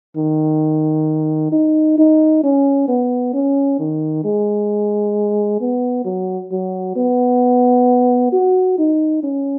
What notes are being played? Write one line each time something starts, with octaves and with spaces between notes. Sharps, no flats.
D#3
D#4
D#4
C#4
B3
C#4
D#3
G#3
B3
F#3
F#3
B3
F#4
D#4
C#4